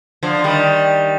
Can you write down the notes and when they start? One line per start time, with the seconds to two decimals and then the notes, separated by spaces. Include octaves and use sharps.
0.23 D3 F3
0.44 D#3 G3